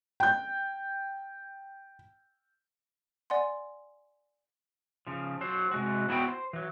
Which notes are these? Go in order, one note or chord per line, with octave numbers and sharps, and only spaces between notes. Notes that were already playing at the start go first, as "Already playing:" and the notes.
G5 G6
D5 F#5 G#5 C6
C#3 F3
F#3 C5
C3 G#3 F#4
B3 E4 F#4 G5
C5
E3 F#3